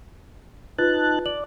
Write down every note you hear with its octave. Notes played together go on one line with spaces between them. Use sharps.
D#4 F4 B4 A5 F#6
D5 F#7